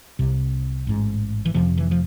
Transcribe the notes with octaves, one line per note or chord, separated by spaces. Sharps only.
C2 C3
A1 G#2
E3
F1 F2 C3 F3
E3
F3